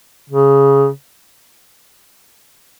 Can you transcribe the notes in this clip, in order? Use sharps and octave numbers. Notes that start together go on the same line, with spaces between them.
C#3